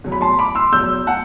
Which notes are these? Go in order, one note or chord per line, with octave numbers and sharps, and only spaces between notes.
E2 B2 F#3
B5
A5 C6
B5 D6
C6 E6
E2 B2 F#3 E6 G6
F#5 A5